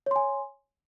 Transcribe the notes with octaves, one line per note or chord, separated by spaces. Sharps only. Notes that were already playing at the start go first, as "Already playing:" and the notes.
C#5 G#5 C6